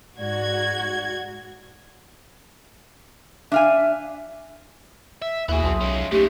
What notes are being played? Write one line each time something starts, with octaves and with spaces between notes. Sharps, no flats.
G#2 F#4 D5 G#6
D4 E5 F5 G#5
E5
D#2 B3 E4 F#4 G#4
B1 A5 C6 D#6
G#3 C#4
F#2 D#3 A3 G4